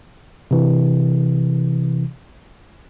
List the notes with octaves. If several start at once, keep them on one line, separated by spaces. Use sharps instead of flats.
C3 E3